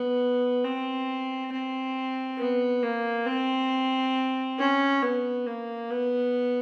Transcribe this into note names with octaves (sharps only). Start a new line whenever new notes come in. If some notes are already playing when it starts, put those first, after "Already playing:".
Already playing: B3
C4
C4
B3
A#3
C4
C#4
B3
A#3
B3